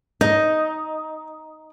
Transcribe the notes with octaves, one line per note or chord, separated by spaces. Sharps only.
D#4 D#5